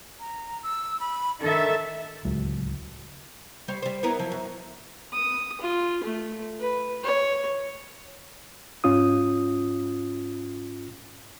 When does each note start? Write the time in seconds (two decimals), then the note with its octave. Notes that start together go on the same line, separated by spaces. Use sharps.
0.20 A#5
0.63 E6
1.00 B5
1.41 D#3 D4 A4 E5
2.25 D1 C#2 F#3 G#3
3.68 G3 C5 C#5
3.82 G3 C5
4.03 B3 E4 A#4
4.19 F3 F#3
4.32 F#2
5.13 D#6
5.61 F4
6.04 A3
6.60 B4
7.03 C#5
8.84 G#2 C#4 F4 D#6